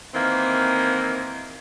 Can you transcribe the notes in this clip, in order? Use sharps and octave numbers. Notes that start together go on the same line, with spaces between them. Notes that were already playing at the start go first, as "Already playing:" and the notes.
D#3 E3 A#3 C4